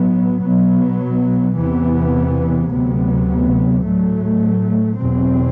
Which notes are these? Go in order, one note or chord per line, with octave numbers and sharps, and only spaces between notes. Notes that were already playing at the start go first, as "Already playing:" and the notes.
Already playing: A2 F#3 B3
B2 F#3 B3
E2 C3 E3 B3
D2 C3 F#3 B3
A2 F#3 A3
E2 B2 F#3 C4